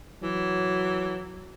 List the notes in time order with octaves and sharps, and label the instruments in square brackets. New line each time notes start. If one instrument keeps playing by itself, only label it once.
[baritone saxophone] E3 [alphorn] F#3